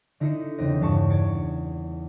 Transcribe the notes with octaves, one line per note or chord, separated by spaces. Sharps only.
D3 D#4 E4 D#5 C7 C#7
E2 C#3 E3 C4 D#4 D#5
E2 G2 C#3 A5 C#6 C7
G#6 A6 C#7 D7